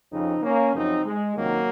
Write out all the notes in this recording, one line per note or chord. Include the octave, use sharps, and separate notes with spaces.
F2 C#3 F3 C4 D#4
A#3 C#4
F#2 C#3 F3 C4 D#4
G#3
C#2 C3 D#3 F#3 A#3